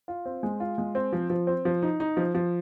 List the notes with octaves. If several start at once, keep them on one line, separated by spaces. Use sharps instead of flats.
F4
C4
G#3
F4
G#3
C4
F3
F3
C4
F3
D#4
D#4
F3
F3